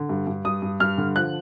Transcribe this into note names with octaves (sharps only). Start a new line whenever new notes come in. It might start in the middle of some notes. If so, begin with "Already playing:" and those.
Already playing: D3
G2
G2
G2 D#6
G2
G2 F6
D3
F3 F#6